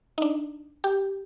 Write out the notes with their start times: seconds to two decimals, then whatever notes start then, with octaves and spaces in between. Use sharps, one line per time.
0.18 D#4
0.22 D4
0.84 G4